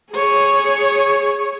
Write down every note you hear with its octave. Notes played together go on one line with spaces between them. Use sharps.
G#4 C#5